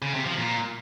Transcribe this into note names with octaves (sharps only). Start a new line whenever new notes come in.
C#3
C3
F3
A#2